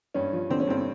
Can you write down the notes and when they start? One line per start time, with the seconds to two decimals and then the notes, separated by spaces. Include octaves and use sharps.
0.14 G2 C#4
0.33 F3
0.50 D3 C4
0.60 C#4
0.67 G2 C4